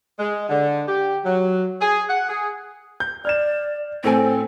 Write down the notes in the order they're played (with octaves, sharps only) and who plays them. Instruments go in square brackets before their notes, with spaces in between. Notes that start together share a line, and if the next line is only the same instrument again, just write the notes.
[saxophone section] G#3
D3
G4
F#3
G#4
F#5
G#4
[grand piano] G6
[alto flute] D5 [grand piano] F6 G#6 E7
[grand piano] A2 A4 G#5 [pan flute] C4 [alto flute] C5